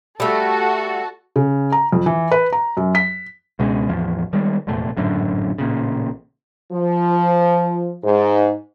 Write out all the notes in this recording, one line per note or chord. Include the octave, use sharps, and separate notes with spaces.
G3 A3 F#4 A4
C#3
A#5
F2
E3
B4
A#5
F#2
B6
C#2 B2 G#3 C#4
A1 E2 F3
D#3 G3 G#3
F1 E2 A#2 A3
G#1 F#2 A2 D3
A1 A#2 C#3
F3
G#2